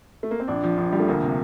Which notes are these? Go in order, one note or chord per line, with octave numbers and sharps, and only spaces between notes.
A3
A#3
C4
A#1 D4
F3
A#1
F3 G3
A3
D2 A#3
C3